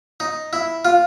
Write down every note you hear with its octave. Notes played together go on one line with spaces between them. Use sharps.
D#4
E4
F4